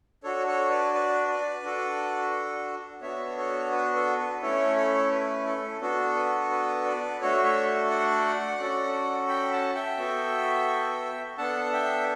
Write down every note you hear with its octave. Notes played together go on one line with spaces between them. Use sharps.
D4 F#4 A4 C#5
A4 C#5
B4 D5
B4 D5
B4 D5
D4 F#4 A4
B3 D4 F#4 C#5 E5
A4 C#5
B4
A4
B4
A3 C#4 E4 A4 C#5
A4 C#5
B4
A4
B3 D4 F#4 A4
B4
B4
B4 D5
A3 D4 F#4 A4 C#5
C#5 E5
D5 F#5
C#4 F#4 A4
G5 B5
F#5 A5
E5 G5
B3 F#4 A4
B3 D4 A4 F#5 A5
E5 G5